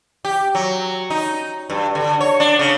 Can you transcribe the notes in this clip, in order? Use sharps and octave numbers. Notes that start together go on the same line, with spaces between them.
G4
F#3
D#4
G2
D3
C#5
D4
C#3